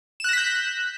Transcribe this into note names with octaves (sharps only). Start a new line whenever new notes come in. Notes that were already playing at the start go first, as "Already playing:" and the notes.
F#6 G6 A#6 B6 E7